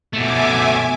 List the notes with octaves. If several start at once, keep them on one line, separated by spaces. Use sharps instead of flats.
B2 A3 E5 G#5 D6